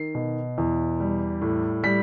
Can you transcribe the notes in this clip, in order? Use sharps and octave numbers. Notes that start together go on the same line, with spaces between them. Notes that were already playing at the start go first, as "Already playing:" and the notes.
Already playing: D#3 C7
B2
E2
G3
A2
G3 B6